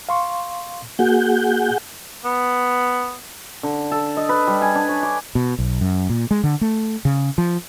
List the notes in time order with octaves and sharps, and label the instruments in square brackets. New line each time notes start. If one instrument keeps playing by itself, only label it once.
[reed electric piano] F5 C6 C#6
[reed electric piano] A#3 F#4 [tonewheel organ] G#4 F#5 G6
[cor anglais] B3
[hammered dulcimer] D3
A4
D#5
B4
G3
G#5
D4
C#5
D6
[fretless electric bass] B2
B1
F#2
A#2
G#3
D3
A3
C#3
F3